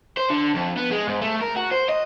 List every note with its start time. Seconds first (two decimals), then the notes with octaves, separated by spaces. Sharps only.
0.17 C5
0.30 D3
0.55 F2
0.77 B3
0.91 G#3
1.07 G#2
1.22 A3
1.41 A#4
1.56 F#4
1.71 C5
1.89 D#5